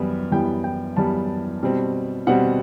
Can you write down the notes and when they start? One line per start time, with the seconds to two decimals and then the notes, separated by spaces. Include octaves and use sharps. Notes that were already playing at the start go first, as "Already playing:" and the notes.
Already playing: F#2 E3 G3 B3
0.32 F#2 E3 G3 B3 G5
0.64 G5
0.97 F#2 E3 G3 B3 A5
1.63 B2 G3 C4
2.27 B2 G3 C4 F#5